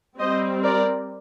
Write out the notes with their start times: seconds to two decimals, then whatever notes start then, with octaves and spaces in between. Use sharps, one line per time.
0.19 G3 C4 C5 D#5
0.64 A#4 D5